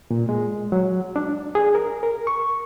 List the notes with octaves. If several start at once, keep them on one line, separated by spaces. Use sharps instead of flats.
A#2
G#3
F#3
D4
G#4
A#4
A#4
C#6